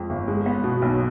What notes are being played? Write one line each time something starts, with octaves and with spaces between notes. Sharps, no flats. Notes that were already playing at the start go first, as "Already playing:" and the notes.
Already playing: F2 G#3
G1
G#3
B3
B2
B1